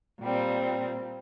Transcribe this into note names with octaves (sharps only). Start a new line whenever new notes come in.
A#2 G3 C4